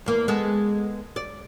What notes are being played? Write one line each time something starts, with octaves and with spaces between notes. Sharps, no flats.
E2 A#3
G#3 B3 A4
D5